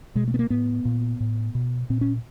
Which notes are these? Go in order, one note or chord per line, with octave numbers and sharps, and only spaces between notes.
B2 G#3
A3
B3
A#3
A2 B3
A#2
A2
B2
A#2 C4
C#4